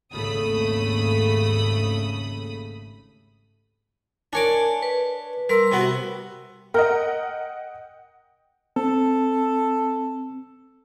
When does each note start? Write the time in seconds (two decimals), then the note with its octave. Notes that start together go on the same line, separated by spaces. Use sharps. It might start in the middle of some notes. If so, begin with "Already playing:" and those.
0.12 G#1 D#2 C#3 A3 B5 D#6
4.33 D4 A#4 C#5 G#5 D6
4.83 B4
5.49 G3 A#4 C6 E6
5.72 C3 B3 F#4
6.74 A#4 D#5 F#5 G5
8.76 C4 A4